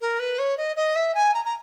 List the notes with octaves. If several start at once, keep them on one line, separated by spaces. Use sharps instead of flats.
A#4
B4
C#5
D#5
D#5
E5
G#5
A#5
A#5